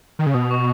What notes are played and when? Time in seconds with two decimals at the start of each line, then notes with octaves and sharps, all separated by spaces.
0.19 D#3
0.26 C#3
0.34 B2 D#6
0.51 C#6